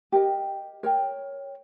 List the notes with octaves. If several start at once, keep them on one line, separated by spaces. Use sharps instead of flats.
G4 A#4 D#5 G5
A#4 C#5 G5